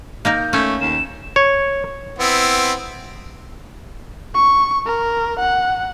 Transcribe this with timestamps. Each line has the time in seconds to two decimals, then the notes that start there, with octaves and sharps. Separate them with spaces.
0.25 A#3 D#4 A#4 G6
0.53 A3 C#4
0.81 D#2 E7
1.36 C#5
2.19 B3 C4 E4
4.35 C#6
4.86 A#4
5.40 F#5